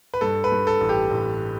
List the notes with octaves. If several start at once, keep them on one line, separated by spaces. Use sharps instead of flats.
B4
G2 A4
B4
G2
A4
A1
G4
A1